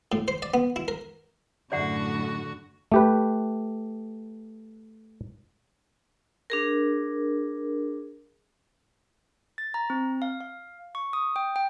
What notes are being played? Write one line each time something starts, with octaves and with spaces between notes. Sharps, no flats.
A2
C5
D5
B3
E4
A#4
F#2 A2 D3 F#4 D5 F#5
A3 G4 B4
D4 G#4 A#4
A6
A#5
C4
F5
F5
C#6
D#6
G5
G5